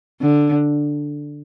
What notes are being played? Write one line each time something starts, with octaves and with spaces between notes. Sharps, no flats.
D3